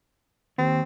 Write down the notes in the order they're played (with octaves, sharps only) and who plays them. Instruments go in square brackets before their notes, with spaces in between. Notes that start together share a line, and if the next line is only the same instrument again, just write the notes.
[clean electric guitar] D#2 [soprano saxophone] C4